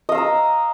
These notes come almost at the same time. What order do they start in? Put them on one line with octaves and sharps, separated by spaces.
D#5 F5 E6 A#5